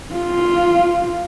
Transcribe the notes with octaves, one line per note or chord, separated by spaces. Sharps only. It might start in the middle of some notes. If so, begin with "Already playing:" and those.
F4